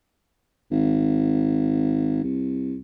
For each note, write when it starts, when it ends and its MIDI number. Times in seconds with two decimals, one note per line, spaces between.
0.71 2.19 32
2.23 2.79 36